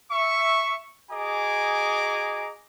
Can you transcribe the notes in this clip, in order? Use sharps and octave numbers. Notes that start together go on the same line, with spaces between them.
E5 C#6
F#4 G#4 D#5 G#5 A#5 D6